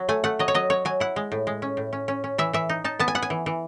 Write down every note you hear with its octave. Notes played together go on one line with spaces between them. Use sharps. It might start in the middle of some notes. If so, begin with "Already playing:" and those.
Already playing: F#3
A3 G#5
A3 F#5
F#3 D#5
C#5
F#3 D#5
F#3 C#5
F#3 G#5
E4 F#5
G#3
A2
G#3
C#4
A2
C#4
C#4
C#4
E3 E5
E3 E5
D#4
D#4 A5
B3 A5
G#5
B3 F#5
G#5
E3
E3